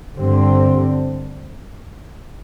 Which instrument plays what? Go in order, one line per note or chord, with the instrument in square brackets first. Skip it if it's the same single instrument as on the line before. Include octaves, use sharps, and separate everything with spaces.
[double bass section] G2 D3 G3 C4